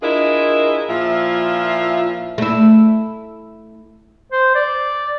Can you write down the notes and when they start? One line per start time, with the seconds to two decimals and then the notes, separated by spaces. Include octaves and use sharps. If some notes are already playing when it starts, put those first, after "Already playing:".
0.03 D4 E4 F4 G#4 A#4 D#5
0.88 A#2 F3 E4 F4 E5
2.38 A3 E4
4.32 C5
4.55 D5